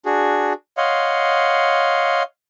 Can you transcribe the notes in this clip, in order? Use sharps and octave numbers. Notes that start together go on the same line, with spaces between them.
D4 F#4 G#4
C#5 D#5 F5 F#5 C6